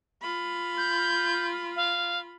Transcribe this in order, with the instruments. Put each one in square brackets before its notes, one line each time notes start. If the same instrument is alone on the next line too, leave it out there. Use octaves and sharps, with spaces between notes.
[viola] F4 B5
[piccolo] G6
F5